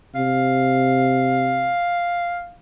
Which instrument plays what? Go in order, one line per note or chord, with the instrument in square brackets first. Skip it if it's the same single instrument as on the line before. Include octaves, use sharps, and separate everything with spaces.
[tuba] C3 [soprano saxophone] F5